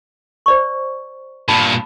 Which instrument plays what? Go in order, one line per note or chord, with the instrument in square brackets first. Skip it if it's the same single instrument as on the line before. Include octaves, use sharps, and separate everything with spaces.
[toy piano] C5 D5 C#6
[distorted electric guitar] G2 A#2 [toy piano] A5 B5